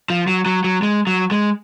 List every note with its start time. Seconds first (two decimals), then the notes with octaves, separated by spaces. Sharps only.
0.10 F3
0.27 F#3
0.46 F#3
0.64 F#3
0.82 G#3
1.07 F#3
1.31 G#3